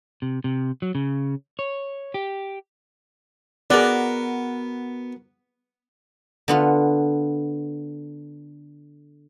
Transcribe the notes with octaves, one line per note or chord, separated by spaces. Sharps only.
C3
C3
F#3
C#3
C#5
G4
B3 F#4 G#4 A#4 D5
D3 B3 F4